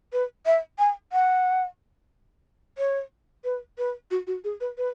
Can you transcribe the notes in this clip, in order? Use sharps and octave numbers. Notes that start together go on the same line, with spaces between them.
B4
E5
G#5
F#5
C#5
B4
B4
F#4
F#4
G#4
B4
B4